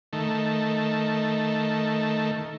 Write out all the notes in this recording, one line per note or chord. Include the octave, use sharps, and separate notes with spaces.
D#3 A3